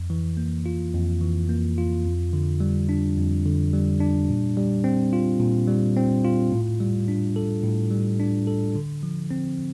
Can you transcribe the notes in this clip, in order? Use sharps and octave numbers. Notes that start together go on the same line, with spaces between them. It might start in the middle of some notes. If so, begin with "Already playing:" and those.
Already playing: F2
E3
A#3
F4
F2
E3
A#3
F4
F2
D3
G3
D4
F2
D3
G3
D4
A#2
G3
C4
F4
A#2
G3
C4
F4
A2
G3
D4
A4
A2
G3
D4
A4
D3
F3
C4